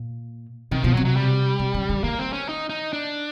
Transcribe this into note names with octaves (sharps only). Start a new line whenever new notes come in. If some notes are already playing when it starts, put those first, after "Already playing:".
Already playing: A#2
C3 D#3
B2 F3
F#3
C3
F#3
G3
C3
C#3
D3
D#3 A#3
C4
C#4
D#4
D#4
D4